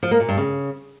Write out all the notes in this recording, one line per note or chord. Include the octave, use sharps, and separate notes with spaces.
F3
A#3
A#2
G2
C#3